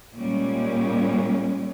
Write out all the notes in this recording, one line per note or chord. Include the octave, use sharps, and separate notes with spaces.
A#2 G3 G#3 C#4